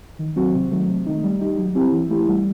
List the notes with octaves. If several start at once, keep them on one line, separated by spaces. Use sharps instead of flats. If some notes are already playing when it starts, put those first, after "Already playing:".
D#3
F#3 C4 F#4
C3
D#3 F#3 A3
C3
D#3 A3 D#4
G3
D#4 G4
F#3
C4 E4 G4
E3
A3 E4 G4
G3